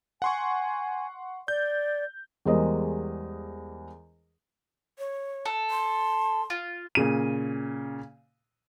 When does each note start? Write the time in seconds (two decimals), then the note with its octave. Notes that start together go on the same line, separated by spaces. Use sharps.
0.22 F#5 G#5 C6 C#6
1.48 D5 G6
2.46 E2 G3 G#3 A#4 C5 D#5
4.99 C#5
5.45 A4
5.71 C6
6.50 F4
6.95 A#2 C#3 D#7